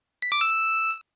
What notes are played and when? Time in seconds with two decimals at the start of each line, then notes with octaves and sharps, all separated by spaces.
0.22 B6
0.32 D6
0.41 E6